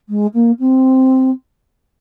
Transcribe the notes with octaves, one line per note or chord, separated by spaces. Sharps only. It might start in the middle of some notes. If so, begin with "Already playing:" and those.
G#3
A#3
C4